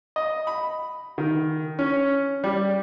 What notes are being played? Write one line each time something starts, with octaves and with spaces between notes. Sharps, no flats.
D#5
B5
D#3
C#4
G3